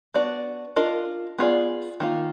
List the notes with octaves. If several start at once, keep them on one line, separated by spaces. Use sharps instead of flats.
B3 D4 F#4 D5
D4 F4 A#4 D#5
B3 F4 G#4 D5
D#3 A#3 F4